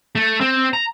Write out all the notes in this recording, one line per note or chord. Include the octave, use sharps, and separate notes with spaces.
A3
C4
A#5